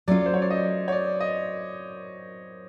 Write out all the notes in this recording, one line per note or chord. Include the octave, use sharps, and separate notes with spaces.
F#3 A3 C#4 F4 D5
C5
C#5
D5
D#5
C#5
D5
D#5